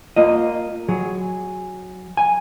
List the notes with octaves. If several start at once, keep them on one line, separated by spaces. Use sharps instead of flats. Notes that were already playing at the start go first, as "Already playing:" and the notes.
A#3 F4 D#5
F#3 G#4
G#5